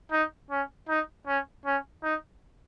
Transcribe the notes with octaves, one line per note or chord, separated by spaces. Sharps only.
D#4
C#4
D#4
C#4
C#4
D#4